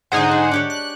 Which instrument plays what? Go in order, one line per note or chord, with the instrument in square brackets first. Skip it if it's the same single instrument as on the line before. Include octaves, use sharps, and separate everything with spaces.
[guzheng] G#2 D3 [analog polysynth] D#4 G#4 C5 [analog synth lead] F#5
[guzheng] D4
D4 G4 C#5
[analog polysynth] F#6